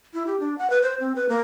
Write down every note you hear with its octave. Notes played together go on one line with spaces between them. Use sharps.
E4
G4
D4
F#5
B4
C5
C4
B4
A#3